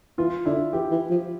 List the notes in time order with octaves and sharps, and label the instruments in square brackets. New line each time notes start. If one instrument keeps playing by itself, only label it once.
[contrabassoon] E3 [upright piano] F4
[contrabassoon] D3 [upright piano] E4
[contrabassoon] E3 [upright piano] G4
[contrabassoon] E3
F3